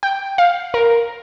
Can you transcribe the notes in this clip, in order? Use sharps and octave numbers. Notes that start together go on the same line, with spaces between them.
G5
F5
A#4